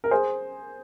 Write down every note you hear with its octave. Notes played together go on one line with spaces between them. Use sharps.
A#4
G#4 C5